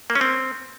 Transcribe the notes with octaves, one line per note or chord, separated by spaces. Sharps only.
A#3
C#4
C4